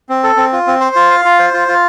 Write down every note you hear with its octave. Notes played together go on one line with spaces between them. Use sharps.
C4
A4
C4
F4
C4
C5
F4
F5
F4
C5
F4
F4